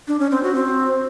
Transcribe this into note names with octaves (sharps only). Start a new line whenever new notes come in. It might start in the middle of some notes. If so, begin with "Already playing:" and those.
D4
C#4
C4
F#4
C4